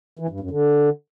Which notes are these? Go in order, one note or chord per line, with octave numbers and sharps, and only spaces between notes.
E3
G2
F#2
D3